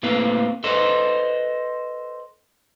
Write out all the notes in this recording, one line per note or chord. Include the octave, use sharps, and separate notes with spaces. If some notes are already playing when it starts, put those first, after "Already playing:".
A2 A#3 C4 B4 F5
A4 B4 C5 D#5